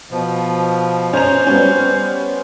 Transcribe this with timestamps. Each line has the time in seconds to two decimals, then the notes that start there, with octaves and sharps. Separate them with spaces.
0.11 B2 F3
1.13 C#4 C5 A#5 F7
1.47 G3 B3 C#4